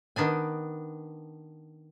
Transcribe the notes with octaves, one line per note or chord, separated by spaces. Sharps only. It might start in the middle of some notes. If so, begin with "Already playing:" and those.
D#3 B3 D4 G#5